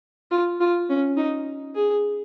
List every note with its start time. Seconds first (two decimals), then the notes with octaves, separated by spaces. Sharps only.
0.31 F4
0.61 F4
0.90 C#4
1.17 D#4
1.75 G#4